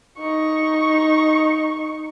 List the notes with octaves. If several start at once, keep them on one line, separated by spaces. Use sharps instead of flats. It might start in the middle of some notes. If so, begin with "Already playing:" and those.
D#4 C#6